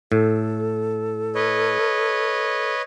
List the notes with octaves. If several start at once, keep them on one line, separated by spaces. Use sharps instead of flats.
A2 A4
B4 C#5 D#5